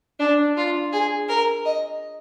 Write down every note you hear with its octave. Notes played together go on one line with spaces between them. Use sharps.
D4
F4
G#4
A#4
D#5